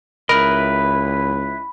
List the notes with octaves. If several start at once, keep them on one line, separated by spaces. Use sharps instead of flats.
C#2 E4 A#4 B4 D#5 B5